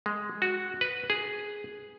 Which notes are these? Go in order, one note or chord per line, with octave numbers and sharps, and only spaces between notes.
G#3
F#4
B4
G#4